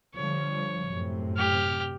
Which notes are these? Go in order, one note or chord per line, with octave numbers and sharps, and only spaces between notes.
D3 F3 G3 C#5
F#2 A2 C3
G4 F6